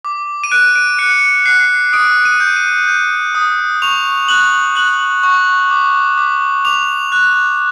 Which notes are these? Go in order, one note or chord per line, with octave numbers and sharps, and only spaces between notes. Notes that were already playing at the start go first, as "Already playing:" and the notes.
D6
D#7
F#6 D7
D7
F#6 C#7
F#6 C7
D#6 D7
D#7
G6
D#7
G6
D#6
C#6 F7
F#6 F#7
F#6 F#7
C#6
D6
D6
D6 F7
F#6